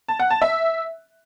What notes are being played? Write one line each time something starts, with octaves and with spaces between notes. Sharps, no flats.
A5
F#5
A5
E5